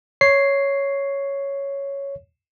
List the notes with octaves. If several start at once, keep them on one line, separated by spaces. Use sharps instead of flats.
C#5 C7